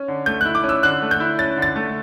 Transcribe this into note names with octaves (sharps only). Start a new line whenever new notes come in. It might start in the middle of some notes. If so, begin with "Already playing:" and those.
Already playing: C#4
D3
A3 G6
F#6
E4
D6
C#4
E6
D3 F#6
A3
G6
E4
C#4 A6
D3
A6
A3